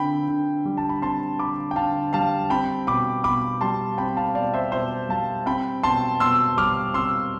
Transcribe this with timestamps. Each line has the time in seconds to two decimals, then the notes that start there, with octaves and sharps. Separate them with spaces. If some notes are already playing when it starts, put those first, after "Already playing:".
Already playing: D3 C4 G5 B5
0.28 D3
0.65 G3
0.77 A5
0.89 B5
1.02 C4 A5 C6
1.39 D3 B5 D6
1.71 G5
1.76 D3 F5 A5
2.13 G3 F5 A5
2.50 C4 G5 B5
2.87 B2 B5 D6
3.24 B2 B5 D6
3.61 G3 A5 C6
3.98 C4 G5 B5
4.17 F5 A5
4.35 B2 D5 F5
4.54 C5 E5
4.72 B2 C5 E5
5.09 G3 F5 A5
5.46 C4 G5 B5
5.83 B2 A5 C6
6.20 B2 C6 E6
6.57 G3 D6 F6
6.94 C4 C6 E6